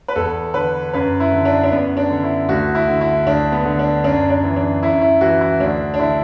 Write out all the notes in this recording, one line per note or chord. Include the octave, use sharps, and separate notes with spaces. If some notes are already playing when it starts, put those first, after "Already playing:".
B4
E2 A4
D3 B4
F#2 B4
E4
D3
D4
D4
F#2 B3
D4
D3
E4
D2 F#4
E4
D3
E4
D2 D4
B3
D3
D4
F#2 D4
D4
E3
D4
F#2 E4
E4
E3 F#4
E4
D2 D4
D4
D3 E4